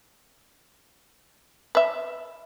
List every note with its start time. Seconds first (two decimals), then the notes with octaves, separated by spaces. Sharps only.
1.75 B4 E5